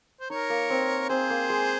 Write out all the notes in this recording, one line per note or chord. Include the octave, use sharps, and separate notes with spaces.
C5
D#4 A#4 C#5
A#3
C4
C4 G#4 C5
A#3
G#3